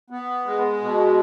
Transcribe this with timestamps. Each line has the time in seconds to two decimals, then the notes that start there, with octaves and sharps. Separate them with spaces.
0.10 B3
0.45 G#3
0.81 B2